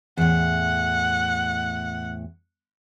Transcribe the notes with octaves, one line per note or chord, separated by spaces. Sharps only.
E2 A2 F#5